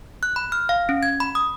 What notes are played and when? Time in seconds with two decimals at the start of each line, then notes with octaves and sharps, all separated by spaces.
0.23 F#6
0.36 B5
0.52 F6
0.69 F5
0.89 C#4
1.03 G#6
1.20 B5
1.35 D#6